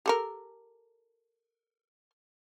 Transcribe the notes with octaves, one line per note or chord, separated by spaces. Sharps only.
G4 A4 A#4